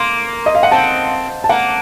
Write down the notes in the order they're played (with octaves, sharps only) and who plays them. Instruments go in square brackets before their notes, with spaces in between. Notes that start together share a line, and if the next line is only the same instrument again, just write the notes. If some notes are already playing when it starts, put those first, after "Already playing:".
Already playing: [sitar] A#3 [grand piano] C6
[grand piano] D#5
F5
F#5
[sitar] C4 [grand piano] A5
[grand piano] A5
[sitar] A#3 [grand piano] F#5